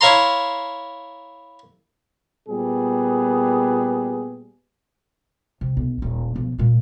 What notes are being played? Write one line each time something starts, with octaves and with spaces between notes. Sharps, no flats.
E4 C#5 F5 A#5 C6
A#2 G3 B3 G#4
C3
B1
D#1
B1 F3
A#2 G#3